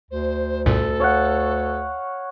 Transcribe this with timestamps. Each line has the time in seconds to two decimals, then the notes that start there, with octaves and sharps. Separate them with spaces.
0.11 D2 C5
0.66 C2 F#2 A#2 A4
1.00 C#5 F5 F#5